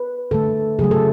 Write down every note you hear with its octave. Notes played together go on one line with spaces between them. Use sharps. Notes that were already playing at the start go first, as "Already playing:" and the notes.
Already playing: B4
D3 A3 A4
C#3 F#3 A3 G#4
A4